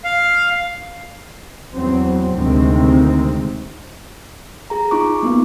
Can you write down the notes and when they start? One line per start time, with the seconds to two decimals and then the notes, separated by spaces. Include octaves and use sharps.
0.04 F5
1.75 E2 F#3 C4
2.35 D2 C3 D#3 G#3 C4
4.70 G#4 A#5
4.91 D#4 F4 C#6 D6
5.23 A#3 B3 F4